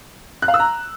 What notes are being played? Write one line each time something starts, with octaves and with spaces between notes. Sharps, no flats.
F#6
F5
E6
A#5